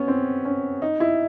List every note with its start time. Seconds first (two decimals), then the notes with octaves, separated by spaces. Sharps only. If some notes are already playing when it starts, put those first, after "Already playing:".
Already playing: B3 C#4
0.08 C4
0.45 C#4
0.82 D#4
1.00 E4